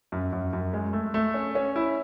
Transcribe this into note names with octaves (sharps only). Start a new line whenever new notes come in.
F#2
F#2
F#2
G#3
A3
A3
C#4
C#4
E4